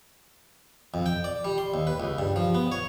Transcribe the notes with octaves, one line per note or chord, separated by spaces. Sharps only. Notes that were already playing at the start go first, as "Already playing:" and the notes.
F2
G5
D5
G3
C6
D#2
B4
C#2
G2
F3
B3
C#5